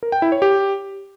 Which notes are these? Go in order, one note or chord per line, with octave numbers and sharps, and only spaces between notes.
A#4
G5
E4
C#5
G4